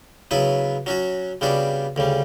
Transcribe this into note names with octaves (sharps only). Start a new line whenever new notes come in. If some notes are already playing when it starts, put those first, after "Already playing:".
C#3 F#3 B3 E4 B4
F#3 C#4 F#4
C#3 G3 B3 D4 F#4
D2 C#3 G3